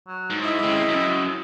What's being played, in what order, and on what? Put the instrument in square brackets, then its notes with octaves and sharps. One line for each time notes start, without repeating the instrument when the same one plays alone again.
[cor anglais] F#3
[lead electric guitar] G#2
[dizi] E4 [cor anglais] D#5
[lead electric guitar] C#3 C4
F#2